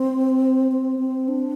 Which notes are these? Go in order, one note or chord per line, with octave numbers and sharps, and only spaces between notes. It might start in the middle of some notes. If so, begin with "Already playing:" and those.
Already playing: C4
C4
C4
D4